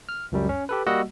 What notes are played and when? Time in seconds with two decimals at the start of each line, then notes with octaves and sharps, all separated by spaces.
0.09 F6
0.32 C#2 F#2 G3
0.49 C#4
0.69 G4 A4 B4
0.87 G3 A#3 F#4 D#5 F#5 E6